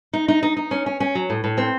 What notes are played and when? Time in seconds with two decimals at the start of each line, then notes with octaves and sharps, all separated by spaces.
0.13 D#4
0.28 D#4
0.43 D#4
0.57 D#4
0.71 C#4
0.86 C#4
1.00 C#4
1.15 F#3
1.30 A2
1.44 A2
1.58 C4